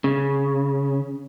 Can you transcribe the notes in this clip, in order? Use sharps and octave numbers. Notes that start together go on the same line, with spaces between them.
C#3